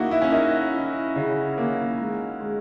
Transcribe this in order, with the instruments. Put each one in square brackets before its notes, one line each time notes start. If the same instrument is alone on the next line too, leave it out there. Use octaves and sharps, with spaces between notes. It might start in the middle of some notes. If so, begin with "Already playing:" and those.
Already playing: [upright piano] A#3 [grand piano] D#4 E4 F#4
[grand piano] E4
C#4
[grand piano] D#4 [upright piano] A#4
[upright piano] E4
C#3
A#3
G#3
G#3